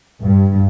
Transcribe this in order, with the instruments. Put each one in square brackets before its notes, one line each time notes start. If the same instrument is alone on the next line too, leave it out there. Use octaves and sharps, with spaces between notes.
[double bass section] G2